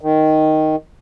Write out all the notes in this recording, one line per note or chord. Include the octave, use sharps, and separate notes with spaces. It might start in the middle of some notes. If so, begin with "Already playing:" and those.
D#3